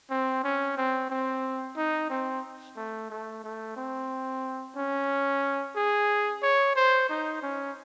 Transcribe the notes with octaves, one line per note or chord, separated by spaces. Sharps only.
C4
C#4
C4
C4
D#4
C4
A3
A3
A3
C4
C#4
G#4
C#5
C5
D#4
C#4